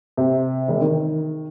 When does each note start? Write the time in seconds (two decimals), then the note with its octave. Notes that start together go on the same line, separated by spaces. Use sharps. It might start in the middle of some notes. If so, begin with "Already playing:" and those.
0.17 C3
0.68 E1
0.81 D#3